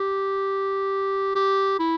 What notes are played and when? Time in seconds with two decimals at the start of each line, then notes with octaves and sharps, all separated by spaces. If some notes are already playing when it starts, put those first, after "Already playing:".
Already playing: G4
1.36 G4
1.79 E4